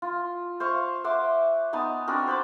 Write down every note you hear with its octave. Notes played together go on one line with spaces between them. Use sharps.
F4
C5 F5 C#6
E5 F#5 C6 D6
B3 D#4 G#5 A5
C4 D4 F#4 A#4
C5 B5 D6